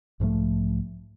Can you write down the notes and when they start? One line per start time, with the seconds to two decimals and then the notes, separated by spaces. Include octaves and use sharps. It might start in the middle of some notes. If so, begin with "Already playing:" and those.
0.20 B1 G#2 F3 A3